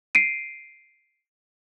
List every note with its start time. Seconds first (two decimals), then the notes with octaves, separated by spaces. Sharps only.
0.15 C7 D7 D#7